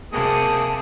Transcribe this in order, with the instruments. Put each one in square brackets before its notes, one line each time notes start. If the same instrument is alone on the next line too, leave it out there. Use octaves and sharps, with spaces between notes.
[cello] C3 [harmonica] A#3 G#4 D#6 [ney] A5